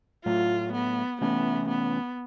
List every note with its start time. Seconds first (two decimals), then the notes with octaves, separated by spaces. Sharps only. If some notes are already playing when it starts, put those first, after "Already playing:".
0.25 A2 F#3 A3 F4
0.73 B3
1.21 C3 E3 A3 B3 C#4
1.69 B3